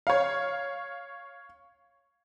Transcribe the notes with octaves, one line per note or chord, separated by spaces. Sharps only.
C#5 F5